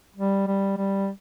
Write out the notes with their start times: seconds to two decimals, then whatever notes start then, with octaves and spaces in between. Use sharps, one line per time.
0.16 G3
0.47 G3
0.77 G3